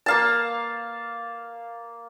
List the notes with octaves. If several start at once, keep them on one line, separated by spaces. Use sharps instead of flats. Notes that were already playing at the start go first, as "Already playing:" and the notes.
A#3 F5 A5